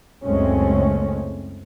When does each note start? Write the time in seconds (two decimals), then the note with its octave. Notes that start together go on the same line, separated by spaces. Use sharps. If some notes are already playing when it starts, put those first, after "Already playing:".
0.24 F#1 C#2 G#3 A3 C4 C#4